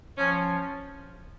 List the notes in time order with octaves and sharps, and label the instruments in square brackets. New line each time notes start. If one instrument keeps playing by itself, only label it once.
[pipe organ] F3 [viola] C#4